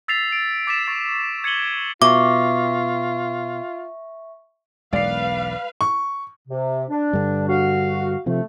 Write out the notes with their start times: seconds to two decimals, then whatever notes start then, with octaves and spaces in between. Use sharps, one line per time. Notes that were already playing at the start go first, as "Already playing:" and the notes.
0.08 E6 A6 B6 C7 F7
0.32 D7
0.67 D6 A6 B6 D7 E7 F7
0.87 C#6 A6 F7
1.44 G#6 C#7 D#7 F#7 G7
2.02 B2 F4 E5 C#6 D6
4.93 E1 B1 G#3 B4 D5 F5 C7
5.81 C#6
6.48 C3
6.89 D4
7.13 G2 D3
7.48 F#4 F5
8.26 C3 F3 A3